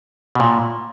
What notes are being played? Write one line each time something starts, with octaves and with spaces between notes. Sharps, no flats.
B2
A#2